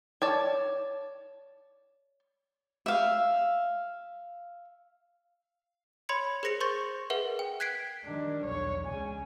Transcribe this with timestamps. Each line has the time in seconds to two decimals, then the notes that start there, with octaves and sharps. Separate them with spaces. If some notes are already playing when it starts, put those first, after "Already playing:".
0.22 C#5 D5 A5
2.86 E5 F5
6.09 C#5 B5 C6 G#6 C#7
6.43 G#4 A#4 C5 A#6 C#7 F7
6.60 C5 C6 C#6 G6 A6
7.10 G#4 A#4 B4 E5 F#5
7.39 G5
7.60 F#6 G#6 B6 C7 D7
8.05 D#3 G3 D4
8.44 B1 E2 C#5
8.87 C#2 C#3 G#5